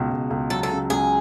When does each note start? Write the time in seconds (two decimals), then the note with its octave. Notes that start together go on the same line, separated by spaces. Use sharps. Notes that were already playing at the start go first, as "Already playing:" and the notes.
Already playing: C#2 B2
0.10 C#2
0.30 C#2
0.50 F#3 A4
0.63 A4
0.70 C#3
0.90 C#2 G#4